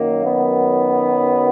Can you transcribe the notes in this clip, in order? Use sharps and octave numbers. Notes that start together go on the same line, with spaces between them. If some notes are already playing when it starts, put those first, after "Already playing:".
Already playing: F#2 D#3 F#3 A#3
B3